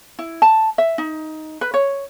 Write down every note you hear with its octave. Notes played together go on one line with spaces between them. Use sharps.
E4
A5
E5
D#4
B4
C#5